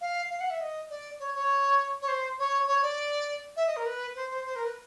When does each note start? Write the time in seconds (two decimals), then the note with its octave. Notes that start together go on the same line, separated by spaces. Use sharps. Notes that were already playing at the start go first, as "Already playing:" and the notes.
0.01 F5
0.30 F5
0.40 F#5
0.50 E5
0.60 D#5
0.89 D5
1.19 C#5
1.34 C#5
2.01 C#5
2.08 C5
2.38 C#5
2.67 C#5
2.82 D5
3.56 E5
3.67 D#5
3.76 A#4
3.85 B4
4.15 C5
4.30 C5
4.45 C5
4.55 A#4
4.65 B4